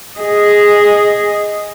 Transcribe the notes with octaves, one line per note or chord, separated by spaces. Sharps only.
G#4 D#5